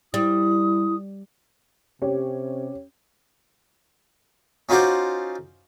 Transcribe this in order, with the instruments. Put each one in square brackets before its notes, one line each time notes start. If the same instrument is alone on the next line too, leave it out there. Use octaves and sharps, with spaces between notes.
[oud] G3 [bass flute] E4 [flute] D#6
[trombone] C3 [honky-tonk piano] C#4 G4 C#5
[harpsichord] C#4 D#4 F4 F#4 C5 D5